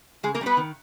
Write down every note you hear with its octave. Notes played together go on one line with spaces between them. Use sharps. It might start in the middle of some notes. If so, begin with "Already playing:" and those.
C#3 G#3 G#4
A#3 A#4
G3 C#4
B3 B4
D#3